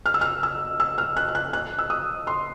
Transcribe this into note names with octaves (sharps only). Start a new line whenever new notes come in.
F6
E6
F6
E6
E6
F6
F#6
F6
F#6
F#6
E6
D#6
C6